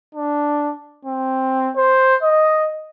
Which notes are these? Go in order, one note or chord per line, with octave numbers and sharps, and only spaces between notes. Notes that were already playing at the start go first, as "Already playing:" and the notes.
D4
C4
C5
D#5